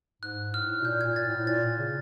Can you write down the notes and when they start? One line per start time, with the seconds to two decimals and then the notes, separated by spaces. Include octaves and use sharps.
0.22 G#2 F#6
0.54 A2 F6
0.81 B2
0.85 A#2 G6
1.01 A#2 G#6
1.16 A6
1.27 A2
1.47 A#2 A6
1.78 C#3